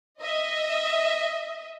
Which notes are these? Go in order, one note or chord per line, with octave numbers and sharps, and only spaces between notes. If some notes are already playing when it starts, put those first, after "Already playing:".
D#5 E5